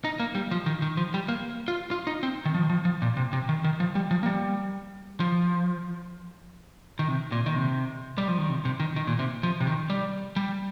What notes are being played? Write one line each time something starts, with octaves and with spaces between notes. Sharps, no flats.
D#4
A#3
G3
F3
D#3
D#3
F3
G3
A#3
F4
F4
D#4
C4
D#3
F3
D#3
F3
F3
A#2
C3
C3
D#3
D#3
F3
G3
F3
A#3
G3
F3
D#3
C3
A#2
D#3
C3
G3
F3
D#3
C3
C3
D#3
D#3
A#2
C3
F3
C3
D#3
G3
G3